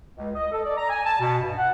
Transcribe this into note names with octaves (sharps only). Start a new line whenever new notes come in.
C#2
D#5
A4
D5
A#5
G#5
A5
B2
G2
F#5